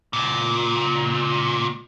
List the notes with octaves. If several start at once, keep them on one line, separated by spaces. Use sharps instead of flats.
C#2 A#2